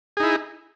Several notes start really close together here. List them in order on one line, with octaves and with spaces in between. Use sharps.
G#4 D#4 E4